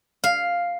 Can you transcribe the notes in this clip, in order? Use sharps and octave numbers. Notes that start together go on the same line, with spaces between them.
F5